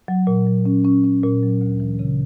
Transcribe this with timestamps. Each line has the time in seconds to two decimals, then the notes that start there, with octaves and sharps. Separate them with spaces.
0.08 F#3
0.27 A#2
0.47 F#3
0.65 C#4
0.85 C#4
1.04 C#4
1.23 A#2
1.43 F#3
1.61 D2
1.80 E3
1.99 C#3